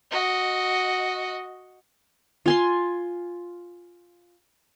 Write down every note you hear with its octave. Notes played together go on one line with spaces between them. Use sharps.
F#4 D#5
F4 G#5 C6